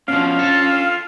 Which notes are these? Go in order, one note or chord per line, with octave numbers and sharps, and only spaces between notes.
B2 F3 C#4 D4 F5
F4 A4